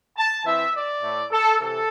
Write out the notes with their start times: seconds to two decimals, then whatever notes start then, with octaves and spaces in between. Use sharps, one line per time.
0.16 A5
0.44 E3 C4 E4 E5
0.73 D5
1.02 A2 A3 E4
1.31 A4
1.59 C3 E3 A4